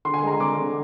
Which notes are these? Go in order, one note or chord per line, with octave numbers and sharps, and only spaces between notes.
D3 C6
G#5
G#3 A#5
C6
C4 D6
D3